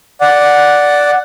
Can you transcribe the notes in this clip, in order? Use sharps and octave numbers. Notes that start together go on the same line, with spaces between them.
D5 F#5